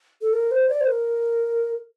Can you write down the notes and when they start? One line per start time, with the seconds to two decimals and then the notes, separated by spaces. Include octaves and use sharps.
0.22 A4
0.33 A#4
0.51 C5
0.69 D5
0.81 C5
0.87 A#4